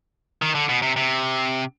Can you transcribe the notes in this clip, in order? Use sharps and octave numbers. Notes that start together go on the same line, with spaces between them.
D#3
D3
B2
C3
C3